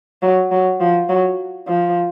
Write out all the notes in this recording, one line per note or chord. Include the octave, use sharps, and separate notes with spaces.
F#3
F#3
F3
F#3
F3